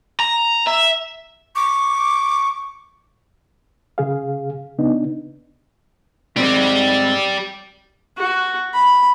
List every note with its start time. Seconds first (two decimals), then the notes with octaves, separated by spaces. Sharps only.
0.20 A#5
0.67 E5
1.56 C#6 D6
3.98 C#3 G#4 F5
4.78 C#3 B3 D4 D#4
6.36 G#2 C4 G4 D5
8.18 F#4
8.74 B5